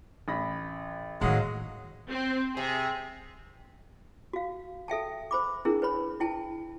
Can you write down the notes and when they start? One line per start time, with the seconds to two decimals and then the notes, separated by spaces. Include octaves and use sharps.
0.28 A1 B5 A#6
1.21 A2 D#3 F#3 G#3 D#5 F5 F#5
2.10 C4
2.57 C3 G#4
4.33 F#4 F5
4.88 A4 E5 G5 A5
5.31 C5 B5 D6
5.65 C#4 D4 E4 G#4 A#4
5.82 B4 C#5 B5
6.20 E4 G5 A5